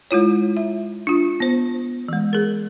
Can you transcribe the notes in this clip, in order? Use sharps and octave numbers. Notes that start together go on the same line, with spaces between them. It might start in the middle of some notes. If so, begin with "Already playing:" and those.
G#3 E4 F4 C#5
E5
D4 F4
B3 C5
E3 G#3
G#4 A#4